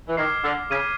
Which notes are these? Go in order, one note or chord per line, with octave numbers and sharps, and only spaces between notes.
E3
D#3 D6 F6 G#6 C7
D3
C#3 G#6 B6 D#7